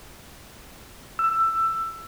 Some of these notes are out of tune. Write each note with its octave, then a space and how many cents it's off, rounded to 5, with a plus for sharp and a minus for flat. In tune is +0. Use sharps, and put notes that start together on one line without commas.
E6 +15